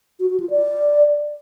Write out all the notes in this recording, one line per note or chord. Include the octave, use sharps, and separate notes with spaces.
F#4
F#4
F4
D5